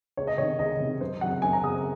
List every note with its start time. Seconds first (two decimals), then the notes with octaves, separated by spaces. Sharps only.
0.17 C#2 C#5
0.27 D#5
0.38 C3 C#5
0.41 D#3
0.59 C#2 D#5
0.80 C3 D#3
1.01 F#2 C5
1.21 C#3 F#3 C4 F#5
1.42 F#2 G#5
1.53 A#5
1.63 C#3 F#3 C4 D#6